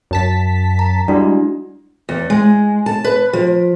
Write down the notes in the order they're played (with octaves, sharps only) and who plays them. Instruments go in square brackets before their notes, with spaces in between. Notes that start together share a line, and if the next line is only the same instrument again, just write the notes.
[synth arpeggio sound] F#2 A5 B6
[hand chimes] A#5
[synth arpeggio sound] G3 G#3 [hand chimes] D4 E4 F#4
[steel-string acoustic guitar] E2
G#3
A5
B4
F3